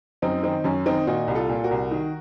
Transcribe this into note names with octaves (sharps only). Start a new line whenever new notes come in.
F#2 C4 D#4
D#3 C4 D#4
F#2 C#4
D#3 C4 D#4
A#2 D#4 F#4
C2
F4 A4
A#2
F#4 A#4
C2
D#3